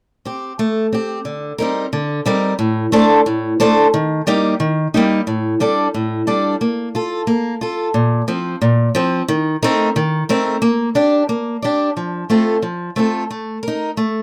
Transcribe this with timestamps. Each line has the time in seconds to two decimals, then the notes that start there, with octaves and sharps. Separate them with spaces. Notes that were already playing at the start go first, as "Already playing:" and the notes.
0.25 C4 G4
0.59 A3
0.93 C4 G4
1.25 D3
1.58 G3 C4 D#4 A#4
1.93 D3
2.26 G3 C4 D#4 A#4
2.59 A2
2.92 A3 D4 A4 C5
3.26 A2
3.60 A3 D4 A4 C5
3.94 D#3
4.27 G3 A#3 D#4 G4
4.60 D#3
4.94 G3 A#3 D#4 G4
5.27 A2
5.60 G3 D4 A4 D5
5.94 A2
6.27 G3 D4 A4 D5
6.61 A#3
6.95 F4 A4
7.27 A#3
7.61 F4 A4
7.94 A#2
8.28 F3 C4
8.62 A#2
8.95 F3 C4
9.28 D#3
9.63 A3 C4 D#4 A#4
9.96 D#3
10.29 A3 C4 D#4 A#4
10.62 A#3
10.95 D4 G4 D5
11.29 A#3
11.62 D4 G4 D5
11.97 F3
12.30 A3 C4 F4 A4
12.62 F3
12.96 A3 C4 F4 A4
13.31 A3
13.63 D#4 A#4
13.97 A3